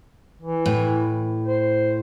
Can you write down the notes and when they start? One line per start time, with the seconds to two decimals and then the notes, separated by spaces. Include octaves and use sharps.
0.42 E3
0.66 A2
1.47 C5